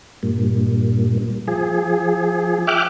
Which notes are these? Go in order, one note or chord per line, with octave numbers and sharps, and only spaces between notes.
G2 A#2
F3 G#4
E5 G5 D6 F6 F#6